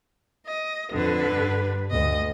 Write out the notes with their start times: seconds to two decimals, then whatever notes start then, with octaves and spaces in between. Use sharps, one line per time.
0.46 D#5
0.92 F2 D3 B4
1.30 G2
1.91 D2 D#5